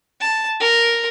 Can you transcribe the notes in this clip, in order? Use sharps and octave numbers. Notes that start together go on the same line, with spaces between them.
A5
A#4